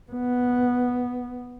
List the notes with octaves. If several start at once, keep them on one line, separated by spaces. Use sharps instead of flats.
B3